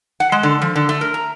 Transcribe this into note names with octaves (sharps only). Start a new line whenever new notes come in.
F#5
G#3
D3
F3
D3
A3
A#4
A#5